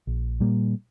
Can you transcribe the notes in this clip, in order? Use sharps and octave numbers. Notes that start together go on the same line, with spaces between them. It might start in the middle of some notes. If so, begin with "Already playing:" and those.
A#1
A#2 G3 A#3